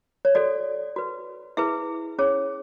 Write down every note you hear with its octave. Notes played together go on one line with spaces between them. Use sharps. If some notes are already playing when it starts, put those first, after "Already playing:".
C#5
F#4 A4 C#5 D5
F#4 B4
E4 G#4 B4 E5
C#4 G#4 C#5